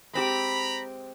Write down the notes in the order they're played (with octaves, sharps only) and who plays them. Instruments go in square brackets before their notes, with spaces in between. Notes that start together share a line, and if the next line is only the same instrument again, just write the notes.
[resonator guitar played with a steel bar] G#3 C4 G4 [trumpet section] A#5 B5